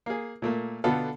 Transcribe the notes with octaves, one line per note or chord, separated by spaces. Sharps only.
A#3 G#4
A#2 A3 A#3
B2 D3 B3 F4 A4